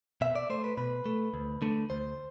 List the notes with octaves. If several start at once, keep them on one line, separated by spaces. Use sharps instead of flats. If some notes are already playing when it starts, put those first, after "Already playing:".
B2 E5
D5
A3 C5
B4
B2 B4
A3
D2
D3 A3
D2 C5